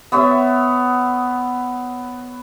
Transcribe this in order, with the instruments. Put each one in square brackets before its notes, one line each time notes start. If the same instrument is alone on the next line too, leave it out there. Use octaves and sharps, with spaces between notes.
[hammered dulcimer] B3 C#5 E5 A#5